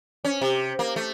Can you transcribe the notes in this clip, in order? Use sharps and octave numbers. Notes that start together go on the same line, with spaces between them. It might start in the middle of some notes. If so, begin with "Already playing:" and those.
C#4
C3
A#3
A3